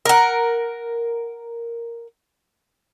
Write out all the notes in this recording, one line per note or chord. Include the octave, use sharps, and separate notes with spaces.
A#4 F#5